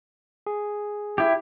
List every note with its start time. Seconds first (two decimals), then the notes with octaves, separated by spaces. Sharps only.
0.47 G#4
1.18 E4 G4